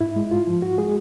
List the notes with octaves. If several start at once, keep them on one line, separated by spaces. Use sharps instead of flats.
G#2 E4
G#3
G#2 F4
F3
G#2 F#4
G#3 G#4